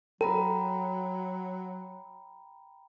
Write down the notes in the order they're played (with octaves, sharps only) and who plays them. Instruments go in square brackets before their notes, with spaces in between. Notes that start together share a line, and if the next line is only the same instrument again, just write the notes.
[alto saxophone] F#3 [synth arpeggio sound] A4 [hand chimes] G5 A#5 B5